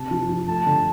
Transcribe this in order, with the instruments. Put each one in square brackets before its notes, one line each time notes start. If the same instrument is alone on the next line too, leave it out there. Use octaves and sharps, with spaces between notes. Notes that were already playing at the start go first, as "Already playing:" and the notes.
Already playing: [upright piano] C3 [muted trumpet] A5
[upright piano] F3
F3
[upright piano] A3 [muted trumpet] A5
[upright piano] D3